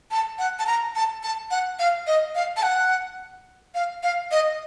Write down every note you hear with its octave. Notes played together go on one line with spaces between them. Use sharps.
A5
F#5
A5
A#5
A5
A5
F#5
F5
D#5
F5
A5
F#5
F5
F5
D#5